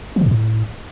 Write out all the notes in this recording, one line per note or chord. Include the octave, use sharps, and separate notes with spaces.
F3
D3
G2
A2